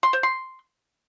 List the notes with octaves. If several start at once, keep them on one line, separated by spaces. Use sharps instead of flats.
C6
C5
C6